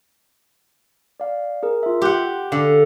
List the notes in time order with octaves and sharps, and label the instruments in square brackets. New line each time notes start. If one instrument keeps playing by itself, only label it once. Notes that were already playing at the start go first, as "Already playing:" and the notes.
[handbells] D5 F5
G#4 A#4
F4 E5
[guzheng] G4 F#5 [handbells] C6 F#6
[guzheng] D3 [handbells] F5 D6